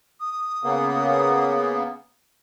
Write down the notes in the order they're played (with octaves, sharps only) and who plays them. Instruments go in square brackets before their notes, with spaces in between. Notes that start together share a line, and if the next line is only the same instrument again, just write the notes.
[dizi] D#6
[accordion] C#3 A#3 B3